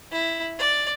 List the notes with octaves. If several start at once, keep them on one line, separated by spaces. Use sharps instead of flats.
E4
D5